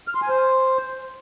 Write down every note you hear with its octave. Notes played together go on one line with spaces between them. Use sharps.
F6
C6
G#5
C5